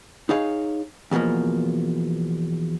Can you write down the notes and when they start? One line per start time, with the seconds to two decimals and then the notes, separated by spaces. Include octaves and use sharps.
0.29 D#4 G#4 C#5 F5
1.11 E2 B2 D#3 F3 A#3